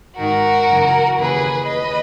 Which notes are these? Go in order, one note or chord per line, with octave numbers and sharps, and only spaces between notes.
G#2 D#3 F#4 A#4
F#2 C#3 E3
D#2 C#3 E3 G#4 B4
D#2 B4 D#5